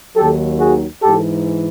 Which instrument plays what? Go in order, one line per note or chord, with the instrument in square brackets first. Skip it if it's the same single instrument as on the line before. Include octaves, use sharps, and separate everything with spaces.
[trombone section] D#2 D#3 F#3 G4 A4
F#4 G#4
G#2 E3 G4 A4